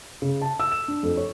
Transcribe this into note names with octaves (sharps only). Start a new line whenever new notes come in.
C#3
A5
E6
E7
D4
F2
C#5